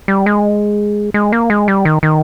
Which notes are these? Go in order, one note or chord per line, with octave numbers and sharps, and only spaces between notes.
G3
G#3
G#3
A#3
G#3
G3
D#3
D#3